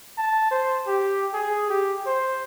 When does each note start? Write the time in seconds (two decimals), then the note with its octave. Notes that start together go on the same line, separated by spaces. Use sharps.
0.18 A5
0.51 C5
0.87 G4
1.34 G#4
1.70 G4
2.06 C5